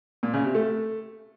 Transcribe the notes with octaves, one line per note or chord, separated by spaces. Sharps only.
A#2
C#3
C3
A3